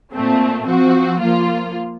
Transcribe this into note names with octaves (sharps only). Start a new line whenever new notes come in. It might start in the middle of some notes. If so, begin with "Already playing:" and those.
A#2 A3 C4
F3 C4 F#4
F3 A#3 F4